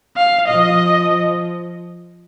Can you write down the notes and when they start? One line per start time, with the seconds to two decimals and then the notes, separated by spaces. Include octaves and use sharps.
0.17 F5
0.48 F3 D#5